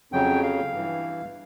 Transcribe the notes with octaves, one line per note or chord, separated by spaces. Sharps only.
F2 C#3 F#3 G5
F5
G2 E3